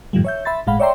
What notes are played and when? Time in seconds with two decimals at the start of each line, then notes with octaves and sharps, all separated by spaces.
0.13 F#2 A2 D#3 F3 G3
0.25 C#5 E5 G6
0.45 E5 B5 C6 A6
0.67 G1 A2 G#3 F5 F#5 B5
0.80 C#5 D5 E5 G5 A#5 C6